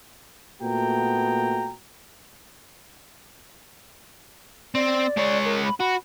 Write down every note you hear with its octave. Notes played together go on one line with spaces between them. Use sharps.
A#2 A3 B3 F#4 G5 A#5
C4 D5
G#3 C#5
A#4
B5
F#4 B5